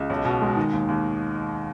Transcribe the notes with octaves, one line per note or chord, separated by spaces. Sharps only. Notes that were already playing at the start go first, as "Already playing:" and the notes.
Already playing: C#2
B1
B2
G#3
D#3
D#2
D#2